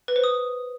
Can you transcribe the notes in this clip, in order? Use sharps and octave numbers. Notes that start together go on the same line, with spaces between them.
B4
C5
D#6